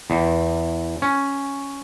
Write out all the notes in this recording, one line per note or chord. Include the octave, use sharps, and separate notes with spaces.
E2
C#4